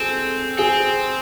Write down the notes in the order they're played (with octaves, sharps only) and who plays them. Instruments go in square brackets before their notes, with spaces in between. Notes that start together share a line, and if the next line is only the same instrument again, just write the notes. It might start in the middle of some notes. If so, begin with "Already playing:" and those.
Already playing: [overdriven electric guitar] C4 [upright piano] G#4 A4
[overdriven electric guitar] C4 [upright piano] G#4